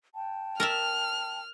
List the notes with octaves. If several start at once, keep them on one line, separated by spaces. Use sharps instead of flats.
G5 A5
A#4 D5 E5 F6